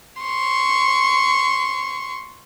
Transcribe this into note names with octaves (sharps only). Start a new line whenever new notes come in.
C6 C#6